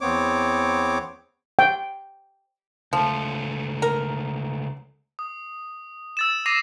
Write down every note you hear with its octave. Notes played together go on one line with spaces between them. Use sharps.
E2 B3 C4 C#5 D6
G5
C#2 F3 A3
A#4
D#6
E6 A6 E7
D6 A#6 C7 D#7 F7